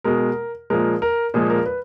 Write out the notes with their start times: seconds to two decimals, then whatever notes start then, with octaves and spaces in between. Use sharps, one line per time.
0.04 B2 G#3 A#4
0.70 A#2 F3 G#3 A#4
1.02 A#4
1.34 A#2 F3 G#3 G#4
1.50 A#4
1.66 B4